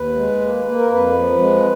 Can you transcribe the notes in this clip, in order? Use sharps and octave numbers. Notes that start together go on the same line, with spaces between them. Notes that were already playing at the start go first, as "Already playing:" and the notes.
Already playing: D#2 B4
G#3
A#3
A#3
A#4
F2 B4
F3
G#3